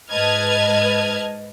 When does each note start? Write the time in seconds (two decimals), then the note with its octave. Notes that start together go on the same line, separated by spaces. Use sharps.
0.11 G#2 B4 D#5 A5 F6 G#6